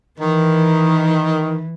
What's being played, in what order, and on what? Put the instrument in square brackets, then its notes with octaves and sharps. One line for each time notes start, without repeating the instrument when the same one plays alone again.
[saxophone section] D#3 [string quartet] E3